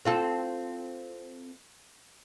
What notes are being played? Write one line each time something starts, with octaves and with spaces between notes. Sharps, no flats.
C4 F4 A4